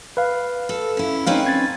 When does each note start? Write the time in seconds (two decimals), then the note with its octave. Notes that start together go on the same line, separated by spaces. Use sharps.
0.17 B4 F5
0.69 A4
0.97 C#4 E4
1.26 C4 C#4 D#4 B4 F5
1.46 G#6 A6